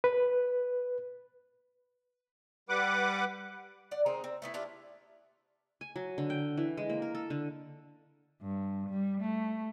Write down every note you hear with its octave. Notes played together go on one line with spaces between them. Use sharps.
B4
G3 B4 F#5 D6
D5 F#5
D#3 G#3 C4 D#4
C4
A3 B3 E4
D4 E4 F4 G4
G#5
F#3
D3
G5
E3
G#3
A#3
A#4
A4
D3
G2
G3
A3